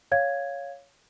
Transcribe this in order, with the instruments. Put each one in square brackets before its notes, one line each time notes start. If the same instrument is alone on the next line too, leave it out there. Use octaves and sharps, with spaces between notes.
[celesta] C#5 F5 G#6